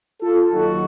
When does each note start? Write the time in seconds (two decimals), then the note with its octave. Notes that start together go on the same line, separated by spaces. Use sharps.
0.21 F4 A4
0.51 D#2 D#3 F#3 D#4 F#4